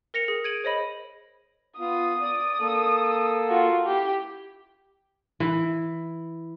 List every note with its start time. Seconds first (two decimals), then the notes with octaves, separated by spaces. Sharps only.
0.14 A#4 A#6 C#7 F7
0.28 G#4
0.44 G#6 D7 D#7 F#7
0.64 C5 C#5 D#5 B5
1.79 B3 F4 D#6
2.21 D5
2.60 A#3 A4
3.48 F4 F#4
3.85 E4 G4
5.40 E3